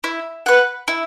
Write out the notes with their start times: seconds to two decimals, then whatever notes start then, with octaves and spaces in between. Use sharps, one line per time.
0.04 E4
0.46 B4 F#5
0.88 E4